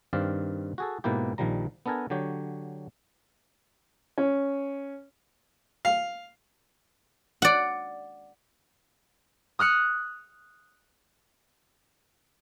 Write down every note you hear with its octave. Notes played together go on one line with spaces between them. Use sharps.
G2 D#3 C4 D5 F5
F#4 G#4 A4
G#2 B2 A#3 E4 G4
A#1 A#2 D#3 F3 G3 A#5
B3 D4 A4 A#4 G#5
D3 F#3 G4 C#5
C#4
F5
D5 F#5
D#6 F6 F#6 C#7